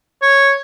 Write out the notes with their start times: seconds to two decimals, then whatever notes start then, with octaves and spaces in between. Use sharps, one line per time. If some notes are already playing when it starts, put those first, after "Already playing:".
0.22 C#5